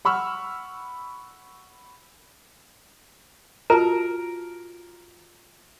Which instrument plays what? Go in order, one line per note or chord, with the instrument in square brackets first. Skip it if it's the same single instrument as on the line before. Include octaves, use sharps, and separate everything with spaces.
[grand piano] F#5 B5 C#6 E6 F6
[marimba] F4 F#4 A5 [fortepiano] A#4